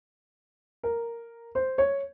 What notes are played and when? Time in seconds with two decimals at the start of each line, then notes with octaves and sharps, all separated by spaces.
0.83 A#4
1.55 C5
1.78 C#5